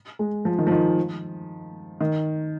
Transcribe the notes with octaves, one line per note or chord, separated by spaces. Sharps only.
G#3
F3
D#3
F3
D#3
D#3